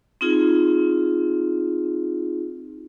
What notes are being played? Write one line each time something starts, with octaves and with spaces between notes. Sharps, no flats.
C4 D#4 F4 G#4